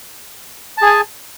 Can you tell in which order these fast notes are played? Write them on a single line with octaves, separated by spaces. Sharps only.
A5 G#4 G#5